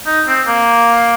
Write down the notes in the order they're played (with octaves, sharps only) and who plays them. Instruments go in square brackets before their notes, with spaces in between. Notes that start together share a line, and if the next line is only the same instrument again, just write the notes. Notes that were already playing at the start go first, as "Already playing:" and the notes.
[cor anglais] D#4
C4
A#3